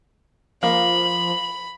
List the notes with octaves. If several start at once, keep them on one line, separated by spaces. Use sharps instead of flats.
F3 A#3 B5 F#7